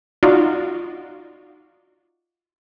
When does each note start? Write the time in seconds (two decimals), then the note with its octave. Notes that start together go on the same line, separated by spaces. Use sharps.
0.23 D#4 F4 F#4 D5